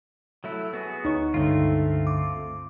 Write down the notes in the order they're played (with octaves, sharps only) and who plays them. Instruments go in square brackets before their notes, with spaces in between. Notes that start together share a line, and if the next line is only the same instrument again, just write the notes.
[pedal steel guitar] F#3 A3 E4
B3 F#4 G#4
[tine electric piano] D2 C#5 C#6 [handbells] D#4
[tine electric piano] C#2 G2 D3 [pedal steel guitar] A3 C4 F4
[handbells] D6